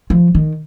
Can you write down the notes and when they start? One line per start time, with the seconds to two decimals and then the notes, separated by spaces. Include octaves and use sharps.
0.10 F3
0.35 D#3